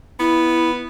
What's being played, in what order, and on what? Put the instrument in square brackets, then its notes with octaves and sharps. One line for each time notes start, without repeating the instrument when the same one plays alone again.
[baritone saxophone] B3 [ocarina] E4